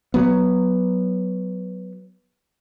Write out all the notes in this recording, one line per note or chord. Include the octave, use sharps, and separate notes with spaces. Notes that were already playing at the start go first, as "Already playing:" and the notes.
F#3 B3